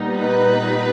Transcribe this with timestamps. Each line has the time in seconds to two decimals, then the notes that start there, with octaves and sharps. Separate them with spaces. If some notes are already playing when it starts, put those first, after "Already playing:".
Already playing: A#2 G3 B3 D#4
0.17 B4